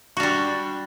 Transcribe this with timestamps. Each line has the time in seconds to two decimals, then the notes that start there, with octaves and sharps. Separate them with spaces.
0.17 F#4
0.20 D4
0.23 G3